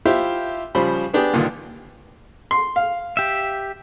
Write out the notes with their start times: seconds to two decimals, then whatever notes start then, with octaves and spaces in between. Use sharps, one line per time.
0.05 E4 F4 G4 C5 E5
0.75 C#3 F3 G3 C5 B5
1.14 B3 D4 G4 G#4
1.33 G2 A#2 D3 D#3
2.51 C6
2.76 F5
3.17 G4 E5